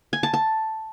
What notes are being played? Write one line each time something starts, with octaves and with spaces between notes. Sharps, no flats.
G#5
A5
A5